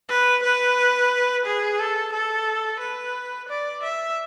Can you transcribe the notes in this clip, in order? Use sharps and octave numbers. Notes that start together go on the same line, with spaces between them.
B4
B4
G#4
A4
A4
B4
D5
E5